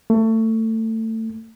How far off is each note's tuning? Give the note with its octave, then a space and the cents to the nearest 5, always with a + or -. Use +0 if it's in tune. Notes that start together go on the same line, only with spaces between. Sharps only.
A3 +25